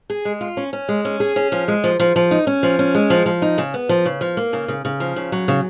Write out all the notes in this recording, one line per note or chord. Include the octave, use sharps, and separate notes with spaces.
G#4
G#3
F4
C#4
C#4
G#3
C#4
G#4
C#4
F3
G#3
F3
F3
F3
D#4
C#4
F3
C#4
G#3
F3
F3
D#4
C#3
B3
F3
C#3
F3
A#3
C#3
C#3
C#3
F3
C#3
F#3
C#3